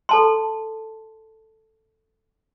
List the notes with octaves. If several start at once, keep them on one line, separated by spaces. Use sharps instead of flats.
A4 A5 C6